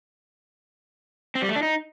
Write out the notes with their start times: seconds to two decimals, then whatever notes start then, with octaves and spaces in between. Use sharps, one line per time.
1.35 C4
1.42 G3
1.49 A3
1.56 D4
1.63 D#4